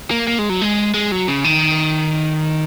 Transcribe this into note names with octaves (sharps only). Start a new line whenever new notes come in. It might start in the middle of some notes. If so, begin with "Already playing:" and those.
A#3
A#3
G#3
F#3
G#3
G#3
F#3
C#3
D#3